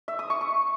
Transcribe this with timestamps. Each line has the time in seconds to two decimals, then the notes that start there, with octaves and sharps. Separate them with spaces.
0.08 E5
0.19 D#6
0.30 C#6
0.41 C#6